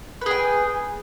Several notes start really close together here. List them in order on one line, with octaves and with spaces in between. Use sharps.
B4 G#4 G5